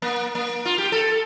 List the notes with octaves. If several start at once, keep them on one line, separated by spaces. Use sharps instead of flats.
A#3
A#3
F4
G4
A4